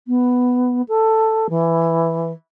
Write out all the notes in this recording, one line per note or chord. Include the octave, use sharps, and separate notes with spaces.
B3
A4
E3